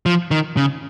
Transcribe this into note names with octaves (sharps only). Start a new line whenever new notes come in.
F3
D#3
C#3